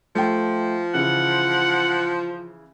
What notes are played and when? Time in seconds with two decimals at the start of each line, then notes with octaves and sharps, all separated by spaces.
0.15 F3 A3 G5
0.94 C#3 E3 F#5